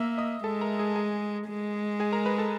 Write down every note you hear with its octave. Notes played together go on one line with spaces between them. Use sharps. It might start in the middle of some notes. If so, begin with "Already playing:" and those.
Already playing: A#3 E5 E6
D#5 D#6
G#3 A4 A5
A#4 A#5
G#4 G#5
G#4 G#5
G#3
G#4 G#5
A#4 A#5
B4 B5
A4 A5